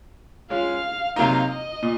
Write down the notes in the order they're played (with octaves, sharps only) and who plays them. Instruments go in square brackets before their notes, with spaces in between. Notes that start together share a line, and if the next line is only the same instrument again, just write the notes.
[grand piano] G#3 C#4 F4 [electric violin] F5
[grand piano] C3 F#3 A#3 D#4 [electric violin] F5
[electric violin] D#5
[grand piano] A#2